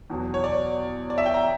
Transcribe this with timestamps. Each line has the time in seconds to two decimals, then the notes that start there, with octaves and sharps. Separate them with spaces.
0.10 E2 B2 F#3
0.34 C#5
0.44 D5
1.10 D5
1.18 E5
1.26 G5
1.34 A#5